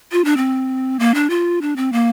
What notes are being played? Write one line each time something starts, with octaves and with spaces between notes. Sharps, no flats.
F4
D4
C4
A#3
D4
F4
D4
C4
A#3